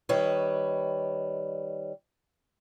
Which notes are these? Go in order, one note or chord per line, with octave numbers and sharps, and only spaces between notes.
D#3 G3 B4 C#5 D#5